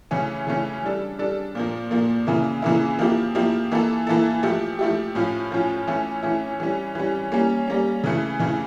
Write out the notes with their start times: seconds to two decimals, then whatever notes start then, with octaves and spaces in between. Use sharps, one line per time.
0.11 C#3 E3 A3 C#4
0.47 C#3 E3 A3 C#4
0.83 G3 D4 A4
1.19 G3 D4 A4
1.55 A#2 F3 A#3
1.91 A#2 F3 A#3
2.27 C#3 E3 A#3 E4
2.62 C#3 E3 A#3 E4
2.99 F3 A#3 E4 G4
3.35 F3 A#3 E4 G4
3.72 E3 A#3 E4 A4
4.07 E3 A#3 E4 A4
4.43 F3 A3 E4 G4
4.79 F3 A3 E4 G4
5.15 A2 F3 C#4 F4
5.51 A2 F3 C#4 F4
5.87 E3 A3 C#4 E4
6.23 E3 A3 C#4 E4
6.60 E3 G3 C#4
6.95 E3 G3 C#4
7.32 G3 A#3 C#4
7.68 G3 A#3 C#4
8.04 C#3 E3 A3
8.39 C#3 E3 A3